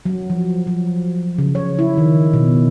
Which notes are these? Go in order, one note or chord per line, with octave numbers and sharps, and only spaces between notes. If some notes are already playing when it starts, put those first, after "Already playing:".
F#3
F3
F3
C#3
C#5
E4
D#3
B2